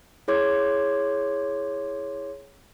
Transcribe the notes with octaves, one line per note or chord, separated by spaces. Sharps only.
E4 G#4 C#5 C6 D6 G#6